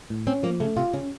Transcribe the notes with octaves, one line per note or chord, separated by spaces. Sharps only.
A2
C4 C#4
F3 A#3
C#3 A3
C3 F4
C#3 C#4